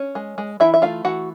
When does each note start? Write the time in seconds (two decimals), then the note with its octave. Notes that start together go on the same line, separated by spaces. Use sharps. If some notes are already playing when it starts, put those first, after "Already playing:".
Already playing: C#4
0.15 G#3
0.38 G#3
0.60 E3 E4 E5
0.74 E5
0.82 A3 F4 F5
1.05 E3 F#4 F#5